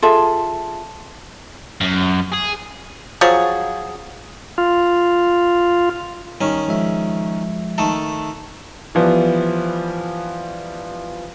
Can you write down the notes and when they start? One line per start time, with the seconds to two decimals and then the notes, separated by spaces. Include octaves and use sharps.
0.02 F4 G#4 A4 E5
1.81 F#2
2.32 G#4
3.21 F3 F#3 G#4
4.58 F4
6.41 D#3 G3 C#4 C#6
6.68 F3 G#3 E5
7.78 D#3 A3 A4
8.95 E3 F3 G3 B3